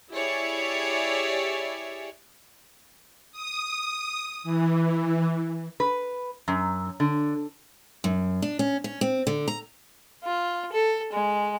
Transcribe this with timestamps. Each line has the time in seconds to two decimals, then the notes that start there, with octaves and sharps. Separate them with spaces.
0.12 E4 G4 G#4 C#5 D5 E5
3.32 D#6
4.43 E3
5.80 B4
6.48 F#2
7.00 D3
8.04 F#2
8.42 D4
8.59 C#4
8.84 C#4
9.01 C4
9.27 D3
9.48 A#5
10.24 F4
10.72 A4
11.13 G#3